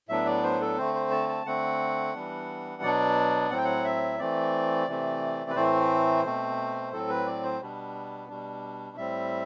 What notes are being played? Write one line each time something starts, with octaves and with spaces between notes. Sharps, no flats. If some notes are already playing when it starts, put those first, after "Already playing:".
A2 F#3 B3 D4 E5
D5
C5
A4
D3 A3 C4 C5
C5
A5
A5
D3 A3 C4 F#5
E3 G3 B3 D4
B2 F#3 B3 D4 D5
A2 F#3 C4 F#5
G5
F#5
E5
E3 A3 C4 D5
C3 E3 A3 C4
B4
A2 E3 A3 C4 C5
B2 A3 C4
A2 F#3 C4 A4
B4
D5
C5
B2 G3 B3 D4
B2 G3 D4
A2 G3 C4 E5